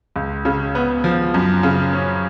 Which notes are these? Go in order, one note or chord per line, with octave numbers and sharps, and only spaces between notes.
C#2
C#3
B3
F3
F#2
C#3
C#4